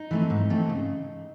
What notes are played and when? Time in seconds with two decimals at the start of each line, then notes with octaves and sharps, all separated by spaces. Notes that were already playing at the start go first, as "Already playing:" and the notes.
Already playing: D#4
0.11 E3 A3 C4
0.30 G#2
0.50 E3 A3 C4
0.69 C#3